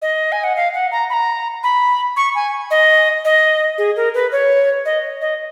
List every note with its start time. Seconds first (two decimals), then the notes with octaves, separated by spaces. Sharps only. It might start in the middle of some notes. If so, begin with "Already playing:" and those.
0.02 D#5
0.32 G#5
0.44 F#5
0.56 F5
0.74 F#5
0.92 A#5
1.10 B5
1.13 A#5
1.63 B5
2.16 C#6
2.35 G#5
2.71 D#5
3.25 D#5
3.78 G#4
3.96 A#4
4.14 B4
4.32 C#5
4.85 D#5
5.21 D#5